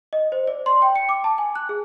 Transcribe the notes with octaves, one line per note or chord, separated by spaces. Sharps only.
D#5
C5
D5
C6
G5
C#7
D6
A5
G#5
F#6
G#4